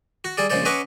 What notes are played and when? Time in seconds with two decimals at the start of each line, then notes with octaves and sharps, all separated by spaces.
0.24 F#4
0.37 G3 G#4 D5
0.50 A#1 C#3 G#3 C5 D5
0.65 C#4 B4 D#5 F#5 C#6 D6